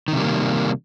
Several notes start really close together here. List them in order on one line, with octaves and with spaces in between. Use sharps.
D#3 C3 G3 A#3